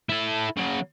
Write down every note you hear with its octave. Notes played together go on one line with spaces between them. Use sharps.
E4 A4
C#3 F#3